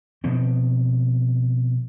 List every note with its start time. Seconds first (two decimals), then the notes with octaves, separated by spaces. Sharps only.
0.24 B2 F3 C4